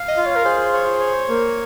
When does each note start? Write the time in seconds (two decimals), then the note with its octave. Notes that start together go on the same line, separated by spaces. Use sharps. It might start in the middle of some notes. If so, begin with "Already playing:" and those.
Already playing: F5
0.08 D#5
0.17 F4
0.26 C#5
0.36 A#4
0.45 G#4 C5
0.73 C#5
1.00 C#5
1.29 A#3